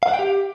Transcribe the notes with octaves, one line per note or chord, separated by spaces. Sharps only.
F5
F#5
G5
G4